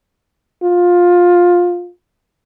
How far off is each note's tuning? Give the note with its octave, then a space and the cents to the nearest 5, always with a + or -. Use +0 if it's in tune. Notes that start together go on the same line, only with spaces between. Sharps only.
F4 +15